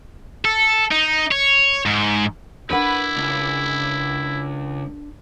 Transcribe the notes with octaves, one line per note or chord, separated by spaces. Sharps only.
A4
D#4
C#5
G#2
D4 E4 A#4 B4 F#5 B5
C#2